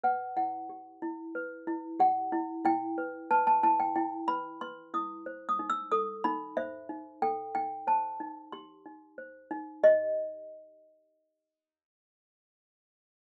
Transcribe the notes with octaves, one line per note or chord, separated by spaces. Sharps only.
B4 F#5
E4 F#5
G4
E4
B4
E4
G4 F#5
E4
E4 G5
B4
B4 A5
A5
E4 A5
G5
E4 G5
B4 B5
B4 C6
E4 D#6
C5
D#6
D#4
E6
A4 D#6
D#4 B5
C5 E5
D#4
A4 G5
D#4 G5
C5 A5
D#4
G4 C6
D#4
C5
D#4
G4 D#5